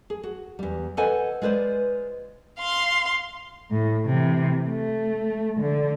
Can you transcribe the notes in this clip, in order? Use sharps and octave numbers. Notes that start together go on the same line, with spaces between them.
G#4
F#4
E2 G3
A4 B4 C5 D#5 F#5 G#5
G#3 F4 B4 C5 D5
F5 C6
A2
C3 E3
A3
D3